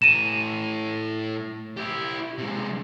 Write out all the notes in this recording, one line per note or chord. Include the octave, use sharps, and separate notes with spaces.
A2 A#5 D#7 E7
E4 G4
C3 G#3